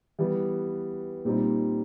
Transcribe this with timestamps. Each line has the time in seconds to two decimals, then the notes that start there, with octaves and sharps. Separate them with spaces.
0.19 E3 G3 B3
1.25 A#2 G3 C4 D#4